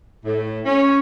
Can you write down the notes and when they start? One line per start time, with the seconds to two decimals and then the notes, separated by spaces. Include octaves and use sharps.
0.24 A2
0.66 C#4